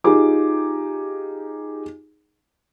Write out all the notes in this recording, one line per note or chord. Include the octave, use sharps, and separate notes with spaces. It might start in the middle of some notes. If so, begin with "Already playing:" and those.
D#4 F4 G4 G#4 D6